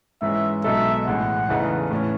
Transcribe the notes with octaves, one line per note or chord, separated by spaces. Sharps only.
G#2 E3 G#3 C#4 E5
B1 B2 G#3 D#4 A4 E5
A1 A2 G#3 F#5
E2 C#3 E3 A3 D#4
A2 E3 A3 C#4